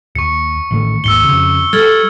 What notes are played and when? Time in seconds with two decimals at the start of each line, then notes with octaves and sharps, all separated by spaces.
0.15 D#2 C#6 C#7
0.71 A1 D#3 A3
1.04 G#1 D#2 E6 C#7 G7
1.25 F2 C#3
1.73 G3 A4 F6 G#6 F#7